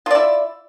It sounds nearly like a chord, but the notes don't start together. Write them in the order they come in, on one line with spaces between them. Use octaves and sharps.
F4 D5 E4